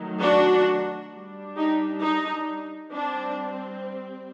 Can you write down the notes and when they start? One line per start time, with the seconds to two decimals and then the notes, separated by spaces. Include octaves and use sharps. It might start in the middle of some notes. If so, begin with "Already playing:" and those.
Already playing: D#3 F#3 A3
0.21 D4 F#4
1.11 G3 D4
1.56 D#4 G4
2.02 D#4
2.92 G3 C4 D4